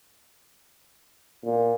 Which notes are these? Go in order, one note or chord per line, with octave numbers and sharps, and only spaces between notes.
A#2